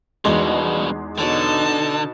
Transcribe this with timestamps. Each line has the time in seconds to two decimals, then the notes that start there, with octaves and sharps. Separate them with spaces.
0.25 E2 G2 B2 G#3 D#4 F#4 C6
1.19 B2 D3 D#4 C#5 A5 D6